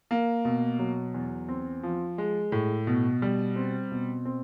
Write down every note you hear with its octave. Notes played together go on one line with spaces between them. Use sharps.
A#3
B2
F#3
E2
C4
F3
G#3
A2
B2
G3
C4
B2
C4